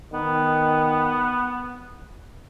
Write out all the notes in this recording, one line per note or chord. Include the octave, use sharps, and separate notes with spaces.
D#3 B3